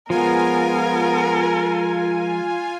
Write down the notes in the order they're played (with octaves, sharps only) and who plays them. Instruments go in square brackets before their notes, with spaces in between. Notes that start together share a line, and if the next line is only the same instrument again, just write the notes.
[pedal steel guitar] F3 G#3 [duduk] B3 [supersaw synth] F4 G#5 [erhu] A#4